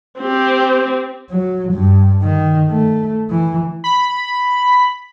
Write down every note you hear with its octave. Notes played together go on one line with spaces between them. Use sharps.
C4 G4
F#3
G2
D#3
A3
E3
B5